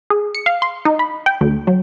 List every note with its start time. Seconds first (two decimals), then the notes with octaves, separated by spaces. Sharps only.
0.10 G#4
0.35 C#7
0.46 F5
0.62 C6
0.85 D#4
0.99 B5
1.26 G5
1.41 D2
1.67 F#3